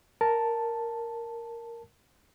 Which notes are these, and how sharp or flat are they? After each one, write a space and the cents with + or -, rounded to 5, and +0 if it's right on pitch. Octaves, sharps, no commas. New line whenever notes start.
A#4 -5 A5 +0